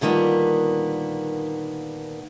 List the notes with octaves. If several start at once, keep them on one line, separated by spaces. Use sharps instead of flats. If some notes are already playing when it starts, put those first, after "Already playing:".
A#2 D3 D#3 G3 A#3 B3